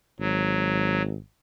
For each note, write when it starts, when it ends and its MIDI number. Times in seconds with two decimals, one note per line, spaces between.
0.20 1.15 32
0.20 1.02 54